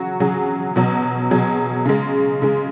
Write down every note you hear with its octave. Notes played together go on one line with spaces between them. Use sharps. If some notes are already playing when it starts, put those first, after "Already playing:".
Already playing: C#3 F#3 F#4
C#3 F#3 G#4
B2 F#3
B2 F#3 G#4
C#3 G#3
C#3 G#3